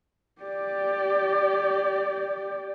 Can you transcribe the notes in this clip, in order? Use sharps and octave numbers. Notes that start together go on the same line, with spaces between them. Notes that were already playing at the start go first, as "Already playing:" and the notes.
G4 D5